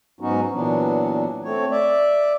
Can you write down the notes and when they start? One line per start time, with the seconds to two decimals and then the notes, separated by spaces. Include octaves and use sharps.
0.21 G#2 F#3 B3 C#4 D#4 F#4
0.53 A#2 E3 F#3 B3 D4
1.44 A3 C4 C#5
1.71 D5 E5